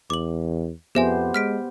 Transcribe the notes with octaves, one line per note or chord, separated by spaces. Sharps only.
E2 D6 F#7
F2 B3 G4 G#4 C5 E5 G#5
G#3 F6 B6 D7